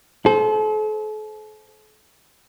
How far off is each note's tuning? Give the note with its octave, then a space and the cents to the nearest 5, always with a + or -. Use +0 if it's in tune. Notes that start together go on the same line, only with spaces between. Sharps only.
A4 -40 C5 +0